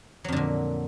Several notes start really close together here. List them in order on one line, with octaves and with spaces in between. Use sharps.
F#3 F2 D3 A#2